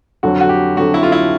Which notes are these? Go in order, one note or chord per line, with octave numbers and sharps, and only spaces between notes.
F2 D3 F#3 F#4
F#4
G4
F2 D3 F#3 F#4
E4
F4
E4